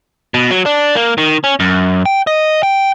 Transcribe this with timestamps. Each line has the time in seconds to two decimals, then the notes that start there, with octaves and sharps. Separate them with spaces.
0.34 B2
0.51 F#3
0.66 D4
0.95 A#3
1.18 D#3
1.44 C#4
1.60 F#2
2.06 G5
2.27 D#5
2.63 G5